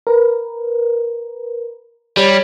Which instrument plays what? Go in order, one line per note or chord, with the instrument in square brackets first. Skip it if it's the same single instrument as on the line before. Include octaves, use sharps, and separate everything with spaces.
[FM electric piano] A#4 B4
[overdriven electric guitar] G3 [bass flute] C#5